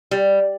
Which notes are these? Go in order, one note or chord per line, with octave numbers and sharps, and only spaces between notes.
G3